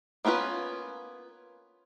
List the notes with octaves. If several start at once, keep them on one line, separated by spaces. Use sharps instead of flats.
A#3 B3 C#4 F4 B4